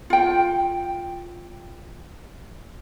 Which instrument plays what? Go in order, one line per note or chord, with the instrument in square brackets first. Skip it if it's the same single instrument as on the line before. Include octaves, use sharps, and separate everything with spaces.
[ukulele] F4 G5